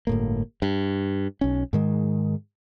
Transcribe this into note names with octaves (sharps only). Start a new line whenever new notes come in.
G1 A2 A#3
G2
B1 C#4
G#2 D#3 G#3